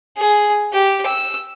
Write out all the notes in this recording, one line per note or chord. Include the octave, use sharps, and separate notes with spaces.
G#4
G4
E6